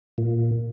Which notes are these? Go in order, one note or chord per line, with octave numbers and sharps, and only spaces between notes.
A#2